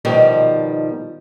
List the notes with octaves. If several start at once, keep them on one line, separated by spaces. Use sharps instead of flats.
B2 D#3 F3 G3